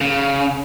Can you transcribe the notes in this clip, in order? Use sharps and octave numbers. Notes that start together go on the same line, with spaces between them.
C#3